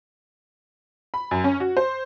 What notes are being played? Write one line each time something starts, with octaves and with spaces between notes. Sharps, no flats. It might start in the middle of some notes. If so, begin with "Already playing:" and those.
B5
F#2
C#4
F#4
C5